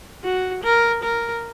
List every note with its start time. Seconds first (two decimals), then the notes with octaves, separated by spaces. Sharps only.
0.24 F#4
0.63 A#4
1.03 A#4